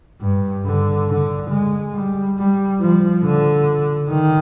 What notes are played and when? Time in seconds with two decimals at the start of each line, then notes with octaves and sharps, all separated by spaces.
0.21 G2
0.65 D3
1.08 D3
1.50 G#3
1.94 G3
2.38 G3
2.80 F3
3.24 D3
4.09 D#3